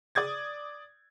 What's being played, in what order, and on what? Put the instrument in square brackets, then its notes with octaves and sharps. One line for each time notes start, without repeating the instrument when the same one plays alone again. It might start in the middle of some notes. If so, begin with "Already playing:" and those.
[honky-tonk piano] D5 D#6 G#6 A6